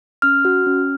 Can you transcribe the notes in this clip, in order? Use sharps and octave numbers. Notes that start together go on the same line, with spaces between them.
C#4 F6
F#4
C#4